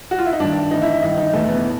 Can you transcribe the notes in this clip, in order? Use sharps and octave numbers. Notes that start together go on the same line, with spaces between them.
F#4
F4
E4
D#4
G2 D#3 D4
A2 E3 D#4
E4
E4
G2 D#3 D#4
D#4
E2 B2 A3
B3
A2